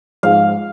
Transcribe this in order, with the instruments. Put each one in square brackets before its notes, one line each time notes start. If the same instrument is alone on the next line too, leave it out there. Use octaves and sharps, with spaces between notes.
[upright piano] G#2 F3 G#3 [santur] F5